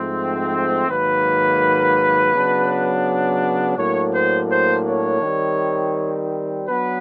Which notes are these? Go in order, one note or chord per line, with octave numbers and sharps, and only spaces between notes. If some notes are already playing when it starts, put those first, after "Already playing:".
Already playing: G#2 F3 A3 C4
G#2 D#3 F#3 A#3 B4
C#3 F#3 B3 D4
A2 F#3 A#3 D4 C#5
C5
C5
C#5
D#3 G3 C4
F#3 B3 D4 B4